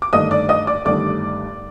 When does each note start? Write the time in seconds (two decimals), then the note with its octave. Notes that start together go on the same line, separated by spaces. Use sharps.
0.02 D6
0.13 G1 G2 D#3 A3 D4 D#5 D#6
0.31 D5 D6
0.49 D#5 D#6
0.67 D5 D6
0.85 G1 G2 D#3 A3 D4 D5 D6